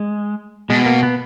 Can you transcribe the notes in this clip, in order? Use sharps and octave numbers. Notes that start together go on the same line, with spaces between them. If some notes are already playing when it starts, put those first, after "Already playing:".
Already playing: G#3
B2 G#3
A#3
B3